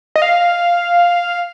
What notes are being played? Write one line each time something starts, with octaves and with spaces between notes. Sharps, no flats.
D#5
F5